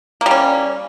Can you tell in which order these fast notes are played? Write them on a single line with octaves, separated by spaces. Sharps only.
A#3 G3 C#4